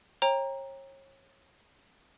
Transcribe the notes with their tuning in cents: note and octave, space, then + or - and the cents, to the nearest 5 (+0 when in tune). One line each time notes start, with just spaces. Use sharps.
C#5 -35 G5 +20 A#5 +5